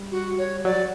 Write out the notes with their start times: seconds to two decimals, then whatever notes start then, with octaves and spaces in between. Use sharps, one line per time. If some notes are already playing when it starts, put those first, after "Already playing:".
Already playing: G3
0.11 F#4
0.38 C#5
0.65 F#3 D5